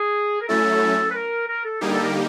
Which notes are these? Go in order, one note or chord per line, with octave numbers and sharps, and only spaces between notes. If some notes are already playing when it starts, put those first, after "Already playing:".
Already playing: G#4
A#4
F#3 A3 C#4 E4 A4
B4
A#4
A#4
A4
D3 G3 A#3 D#4 G4 G#4
A4
A#4